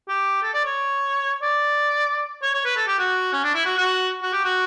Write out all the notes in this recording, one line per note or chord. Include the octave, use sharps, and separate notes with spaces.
G4
A4
D5
C#5
D5
C#5
C#5
B4
A4
G4
F#4
C#4
D4
E4
F#4
F#4
F#4
G4
F#4